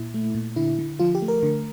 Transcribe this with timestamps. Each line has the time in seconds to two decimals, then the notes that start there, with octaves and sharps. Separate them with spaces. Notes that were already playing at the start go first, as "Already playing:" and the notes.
Already playing: A#2 E4
0.14 A3
0.35 A#2
0.56 D3 E4
0.79 D3
1.00 F3 F4
1.15 G4
1.22 A3
1.28 A#4
1.43 D3